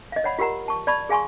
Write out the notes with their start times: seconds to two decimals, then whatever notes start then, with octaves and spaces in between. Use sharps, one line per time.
0.12 D#5 F5
0.24 C#5 D5 F#5 B5
0.39 F4 G4 A#4 F#5 A#5
0.68 A5 C#6
0.87 D5 A5 B5 C#6
1.09 G#4 F5 G#5 C6 C#6